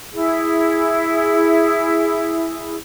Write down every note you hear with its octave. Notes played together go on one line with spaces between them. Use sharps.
E4 G#4